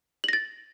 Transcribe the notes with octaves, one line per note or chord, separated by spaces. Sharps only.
A6 A#6 F#7